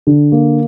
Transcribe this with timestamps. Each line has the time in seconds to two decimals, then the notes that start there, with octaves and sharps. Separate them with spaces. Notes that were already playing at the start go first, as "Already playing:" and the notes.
0.07 D3
0.32 A#3